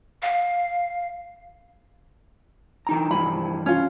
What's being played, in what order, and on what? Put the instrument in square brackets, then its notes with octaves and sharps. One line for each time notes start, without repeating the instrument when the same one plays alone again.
[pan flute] F5
[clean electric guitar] E3 D#4 A#5
[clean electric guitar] G2 E3 F3 [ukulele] B5
[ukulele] C#4 F4